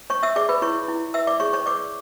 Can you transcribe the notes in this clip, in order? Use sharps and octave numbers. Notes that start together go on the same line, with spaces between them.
C#5 C#6
E5 E6
G#4 D5 D6
B4 B5
E4 C#5 C#6
E4
B4 E5 E6
D5 D6
G#4 C#5 C#6
C#5 C#6
B4 D5 D6